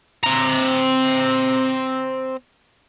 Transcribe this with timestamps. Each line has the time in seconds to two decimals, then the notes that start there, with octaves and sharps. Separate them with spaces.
0.24 C4 A#5